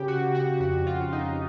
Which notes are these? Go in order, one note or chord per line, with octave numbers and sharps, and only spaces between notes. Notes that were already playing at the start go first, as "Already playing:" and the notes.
Already playing: C#3 G4
F#4
C#3
F#4
F2 F#4
F4
C#3
D#4